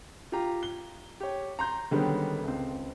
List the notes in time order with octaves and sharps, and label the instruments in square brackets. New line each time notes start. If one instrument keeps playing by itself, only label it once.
[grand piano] F4 G4 A#5
G7
G4 C#5
A#5 C6 G6
D3 D#3 G3 G#3 B3 C#4
C#2 C4